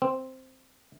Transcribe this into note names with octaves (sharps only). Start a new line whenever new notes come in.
C4